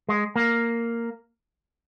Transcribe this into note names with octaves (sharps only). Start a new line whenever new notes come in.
G#3
A#3